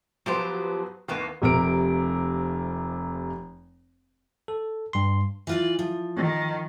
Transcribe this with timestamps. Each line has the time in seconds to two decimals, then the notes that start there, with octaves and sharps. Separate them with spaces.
0.26 F3 F#3 B3 G4 C5
1.08 D#2 D#3 E3 A#3 B3
1.42 F1 C3 A#4 D7
4.48 A4
4.93 G2 C6
5.47 E3 F4 D5
5.79 F3
6.16 D#3